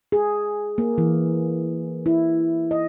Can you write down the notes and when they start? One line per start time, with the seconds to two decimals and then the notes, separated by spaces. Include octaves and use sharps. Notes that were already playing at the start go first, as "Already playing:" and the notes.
0.12 G#4
0.78 A#3
0.98 E3
2.06 E4
2.71 D#5